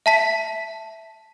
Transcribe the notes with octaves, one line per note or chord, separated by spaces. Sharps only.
E5 A5 B6